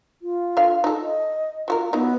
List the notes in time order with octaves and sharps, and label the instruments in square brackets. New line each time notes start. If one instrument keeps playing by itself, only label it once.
[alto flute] F4
[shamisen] D3 F5
D#4 A4
[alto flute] D#5
[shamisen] F#3 F#4 A#4 [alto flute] F4
[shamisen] F#3 D#4 [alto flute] B3